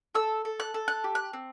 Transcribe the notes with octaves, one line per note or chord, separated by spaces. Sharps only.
A4 E6
A4
F#6
A4
F#6
G4
F#6
C4